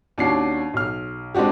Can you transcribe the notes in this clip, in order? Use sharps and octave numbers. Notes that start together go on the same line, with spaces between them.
D#2 C#4 D4 F#4 C7
B1 F6
G#3 C4 D4 F#4 G4